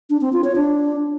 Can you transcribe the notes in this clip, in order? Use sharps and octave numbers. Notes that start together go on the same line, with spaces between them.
D4
C4
F4
C#5
D4